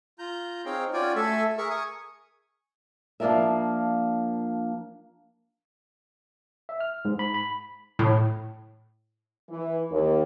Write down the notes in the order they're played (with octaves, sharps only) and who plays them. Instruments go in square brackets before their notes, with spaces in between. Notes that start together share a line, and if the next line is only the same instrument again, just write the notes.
[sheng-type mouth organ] F4 A#5 G6
C4 D#4 G#4 C#5 F5 G5
C#4 F4 F#4 D5 G5 G#5
A3 A4 E5 G#5
G#4 A#4 E5 C#6
G#5 C#6 D#6
[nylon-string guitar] F3 A#3 D4 F4 A#4 E5
[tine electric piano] E5
F6
G#2
B5
B5
[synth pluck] A2
[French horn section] E3
D#2